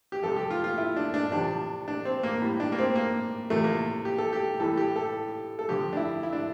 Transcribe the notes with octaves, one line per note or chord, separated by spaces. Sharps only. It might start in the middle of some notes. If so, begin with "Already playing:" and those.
G4
F2 C3 G3 A4
G4
F4
F4
E4
D4
D4
E2 C3 F3 D4
D4
C4
A#3
A2 G3
D4
A#3
C4
A#3
E2 C3 F3 A3
A#3
G4
A4
G4
A2 E3 G3 A4
G4
A4
A4
F2 D3 F3 G4
D4
E4
E4
D4